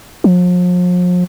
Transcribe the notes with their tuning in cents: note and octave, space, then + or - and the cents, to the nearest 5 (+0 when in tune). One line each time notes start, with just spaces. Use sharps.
F3 +40